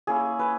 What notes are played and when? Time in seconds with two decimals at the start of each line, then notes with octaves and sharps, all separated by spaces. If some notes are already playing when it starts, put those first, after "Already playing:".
0.07 A#3 C#4 E4 G#4
0.39 B4